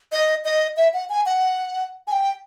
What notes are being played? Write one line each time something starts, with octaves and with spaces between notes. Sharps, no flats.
D#5
D#5
E5
F#5
G#5
F#5
G#5
G5